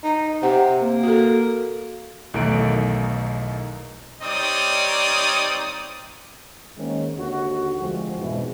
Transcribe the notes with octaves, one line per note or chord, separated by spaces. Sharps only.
D#4
C3 F#5
A#3
F#4 A4
B1 E2 D#3 A3 D#4 D7
G3 C4 D#4 C#5 D5 D#6
D#3 G#3 A#3 C4 C#4
D#2 D3 F#4
C2 F3 G#3 C4 F#4 G#4
F2 G#2 B2 D3 E3 G#3